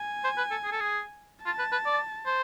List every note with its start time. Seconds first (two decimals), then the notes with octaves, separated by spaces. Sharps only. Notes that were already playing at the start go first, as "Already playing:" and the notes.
Already playing: G#5
0.24 C5
0.37 B4
0.51 A4
0.64 G#4
0.72 A4
0.80 G#4
1.45 F4 A5
1.59 B4
1.72 B4
1.86 D5
2.26 C5